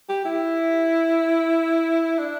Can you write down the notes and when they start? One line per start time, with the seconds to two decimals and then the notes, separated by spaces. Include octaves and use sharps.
0.09 G4
0.25 E4
2.19 D4